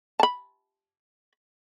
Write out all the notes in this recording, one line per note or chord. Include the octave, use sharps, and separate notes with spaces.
A5 B5